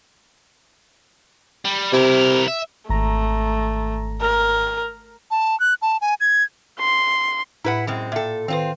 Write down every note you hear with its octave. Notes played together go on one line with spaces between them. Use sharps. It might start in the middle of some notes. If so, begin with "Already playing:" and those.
G3
C3 E4 A#4
E5
G#1 A3 A#5 A#6
A#4
A5
F#6
A5
G#5
G#6
C6
A2 E4 B4 F#5
F#2 G#3 C4
A#2 A4 E5 G5
D#3 C4 F4 B4